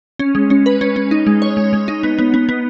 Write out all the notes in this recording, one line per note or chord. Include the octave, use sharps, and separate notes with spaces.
C#4
G#3
C#4
B4
C#4
C#4
D#4
G#3
C#5
G#3
G#3
D#4
B3
B3
B3
B3